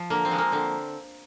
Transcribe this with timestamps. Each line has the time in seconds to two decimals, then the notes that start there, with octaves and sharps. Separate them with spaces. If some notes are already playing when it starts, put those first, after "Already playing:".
Already playing: F3
0.10 D3 A#3
0.25 C4
0.31 F3 G#3
0.38 A#3
0.52 D3 C4